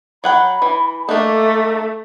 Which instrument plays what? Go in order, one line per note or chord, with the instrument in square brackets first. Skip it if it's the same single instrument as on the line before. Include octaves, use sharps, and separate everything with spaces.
[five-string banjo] F#3 F#5 G5 [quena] B5
[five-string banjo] E3
[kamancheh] A3 [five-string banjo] A#3 D4 D#4 [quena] A4